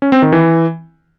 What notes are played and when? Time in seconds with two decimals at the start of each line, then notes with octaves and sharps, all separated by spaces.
0.02 C#4
0.12 C4
0.22 D#3
0.32 E3